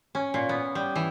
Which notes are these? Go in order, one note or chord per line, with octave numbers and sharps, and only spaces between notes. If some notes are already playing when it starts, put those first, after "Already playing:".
C#4
A#2
B3
G3
E3